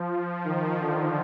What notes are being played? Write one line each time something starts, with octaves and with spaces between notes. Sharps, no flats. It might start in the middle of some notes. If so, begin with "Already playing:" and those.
Already playing: F3
D#3
D3